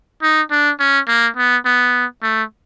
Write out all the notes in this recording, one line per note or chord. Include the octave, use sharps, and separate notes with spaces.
D#4
D4
C#4
A#3
B3
B3
A3